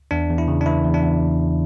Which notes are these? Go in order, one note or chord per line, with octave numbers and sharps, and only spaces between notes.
E2 D4
E2
E4
C#3
D4
E3 E4
E2
D4
E2